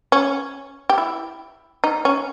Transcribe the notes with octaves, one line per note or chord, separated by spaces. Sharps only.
C#4
G4
E4
D#4
C#4